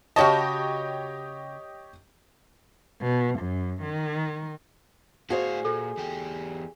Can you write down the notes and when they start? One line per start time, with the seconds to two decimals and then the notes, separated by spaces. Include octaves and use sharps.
0.16 C#3 F#4 G4 C#5 D#5 A5
3.02 B2
3.40 F#2
3.82 D#3
5.30 A2 F#4 G#4 C5 F5 G#5
5.65 A#2 A4
5.98 E2 G4